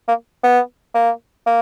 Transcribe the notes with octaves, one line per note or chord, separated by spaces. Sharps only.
A#3
B3
A#3
A#3